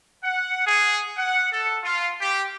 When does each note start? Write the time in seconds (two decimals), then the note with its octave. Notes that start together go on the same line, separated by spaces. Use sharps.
0.22 F#5
0.66 G#4
1.16 F#5
1.51 A4
1.83 F4
2.20 G4